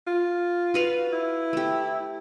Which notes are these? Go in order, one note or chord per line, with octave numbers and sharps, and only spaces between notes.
F4
F#4 B4 F5
E4
A3 G4